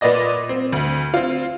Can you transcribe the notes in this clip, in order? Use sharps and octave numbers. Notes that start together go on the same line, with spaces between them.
A#2 B4 D5 D#5 A#6
C4
D2
C4 F4